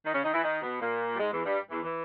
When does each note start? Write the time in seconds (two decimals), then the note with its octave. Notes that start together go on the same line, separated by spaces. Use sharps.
0.05 D#3 D#4
0.14 C#3 C#4
0.24 D#3 D#4
0.33 E3 E4
0.44 D#3 D#4
0.62 B2 B3
0.81 A#2 A#3
1.15 G3
1.19 G#2 G#3
1.32 E2 E3
1.45 G2 G3
1.70 E2 E3
1.83 E3